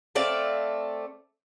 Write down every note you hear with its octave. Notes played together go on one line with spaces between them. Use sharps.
A3 C4 D5 F5